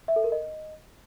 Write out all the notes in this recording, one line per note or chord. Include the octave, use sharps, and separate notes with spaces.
E5
A4
A#4
D#5